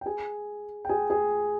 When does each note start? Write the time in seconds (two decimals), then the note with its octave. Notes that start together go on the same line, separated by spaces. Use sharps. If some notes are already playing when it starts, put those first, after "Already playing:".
0.01 G5
0.06 G#4 G#5
0.85 G5
0.89 G#4 G#5
1.10 G#4 G#5